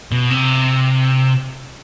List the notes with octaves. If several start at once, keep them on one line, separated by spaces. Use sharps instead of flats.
B2
C3